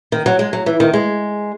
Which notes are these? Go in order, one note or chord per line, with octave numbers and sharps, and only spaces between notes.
D#3
F#3
G#3
F#3
E3
D#3
G#3